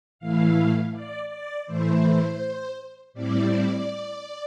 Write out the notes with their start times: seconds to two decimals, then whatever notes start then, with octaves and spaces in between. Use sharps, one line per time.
0.19 A2 E3 A3 E4 F5
0.93 D5
1.29 D5
1.66 A2 E3 A3 E4 C5
3.14 A2 G3 C4 E4 D5